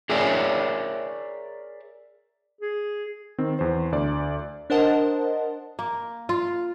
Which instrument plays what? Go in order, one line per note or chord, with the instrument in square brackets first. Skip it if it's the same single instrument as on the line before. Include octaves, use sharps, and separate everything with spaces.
[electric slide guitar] G#4 A#4 C#5 D5 E5 G5
[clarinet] G#4
[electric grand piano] D#3 C4
E2 C5
D2 D5
[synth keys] D4 A#4 C5 D#5 F#5 A5
[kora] A#3
F4